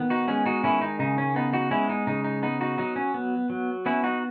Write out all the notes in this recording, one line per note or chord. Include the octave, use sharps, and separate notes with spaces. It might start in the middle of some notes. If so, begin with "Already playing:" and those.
Already playing: D#3 B3
D#4 F#4
G#3 C#4
D#4 F#4
D#3 C#4 E4
D#4
C#3 D#4
C#4
B3 D#4
D#4 F#4
G#3 C#4 E4
D#4
C#3 D#4
D#4
B3 D#4
D#4 F#4
F#3 D#4
C#4
B3
F#3
B3 C#4 E4
D#4 F#4